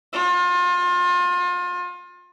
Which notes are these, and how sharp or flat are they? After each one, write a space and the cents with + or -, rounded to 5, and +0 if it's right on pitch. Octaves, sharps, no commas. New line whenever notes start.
F4 +30